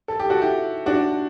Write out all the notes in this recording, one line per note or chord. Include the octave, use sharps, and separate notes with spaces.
A4
G4
F#4 A4
E4 G4
D4 F#4